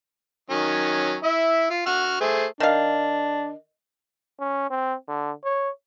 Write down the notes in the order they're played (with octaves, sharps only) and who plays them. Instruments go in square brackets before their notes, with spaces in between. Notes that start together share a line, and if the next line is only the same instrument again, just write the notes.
[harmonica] D#3 F#3 C#4
E4 E5
F4
F#4 F#5 F6
A3 G#4 C5
[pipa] D#3 F5 [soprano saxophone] D4
[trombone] C#4
C4
D3
C#5